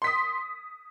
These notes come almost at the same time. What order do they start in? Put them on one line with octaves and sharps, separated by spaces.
C6 B6 D#6